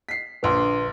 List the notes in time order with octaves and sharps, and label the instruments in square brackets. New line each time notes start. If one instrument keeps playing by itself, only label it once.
[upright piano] B6 C7
[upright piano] A#1 D3 [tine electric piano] B4 C6